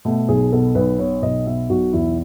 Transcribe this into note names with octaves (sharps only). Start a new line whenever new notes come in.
B2 A3
B1 G#4
B2 A4
B1 B4
B2 C#5
B1 D#5
B2 E5
B1 F#4
E2 E4